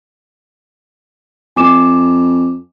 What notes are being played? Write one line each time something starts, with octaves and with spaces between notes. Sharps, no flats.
F2 G#5 D6 E7